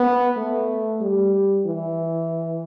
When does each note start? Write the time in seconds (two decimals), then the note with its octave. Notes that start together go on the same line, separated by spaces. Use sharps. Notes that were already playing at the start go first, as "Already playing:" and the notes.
Already playing: B3
0.36 A3
1.01 G3
1.65 E3